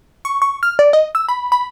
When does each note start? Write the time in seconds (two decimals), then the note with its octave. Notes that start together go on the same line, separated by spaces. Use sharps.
0.25 C#6
0.42 C#6
0.63 F6
0.79 D5
0.93 D#5
1.15 E6
1.29 B5
1.52 B5